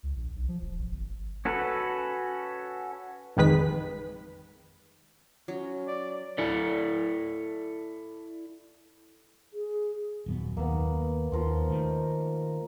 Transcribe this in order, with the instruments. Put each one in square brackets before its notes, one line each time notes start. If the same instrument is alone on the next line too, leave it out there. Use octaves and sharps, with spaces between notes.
[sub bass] C#2
A#1
B1
F3
E1
A1
G1
[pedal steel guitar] C#4 F#4 A4 B4
[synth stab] A1 F2 D#3 G#3 B4 B6
[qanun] F#3 [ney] C#4
[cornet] D5
[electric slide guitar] E4 A4 D5
[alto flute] G#4
[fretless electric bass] D#1 F#2 B3
[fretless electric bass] D#2 [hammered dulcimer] A#3 B3
[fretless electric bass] D#2 [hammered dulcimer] F3 A#4 C6
[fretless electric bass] D#3 A3